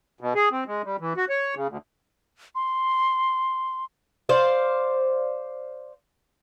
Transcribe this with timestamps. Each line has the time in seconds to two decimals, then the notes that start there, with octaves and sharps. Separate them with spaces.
0.21 B2
0.35 G#4
0.51 C4
0.67 G#3
0.84 G3
0.99 E3
1.17 F#4
1.29 C#5
1.55 C#3
1.69 D2
2.55 C6
4.29 C5 D5 F5